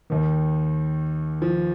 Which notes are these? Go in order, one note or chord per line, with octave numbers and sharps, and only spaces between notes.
D#2 D#3
F3